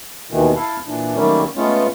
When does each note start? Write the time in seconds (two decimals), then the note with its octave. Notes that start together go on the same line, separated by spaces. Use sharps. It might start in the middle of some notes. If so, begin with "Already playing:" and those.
0.31 D#2 B2 D#3 E3
0.56 E4 A4 F5
0.86 A#2 E3 D4
1.15 D#3 F#3 G3 A3 A#3 C#4
1.56 G#3 A3 B3 C#4 F4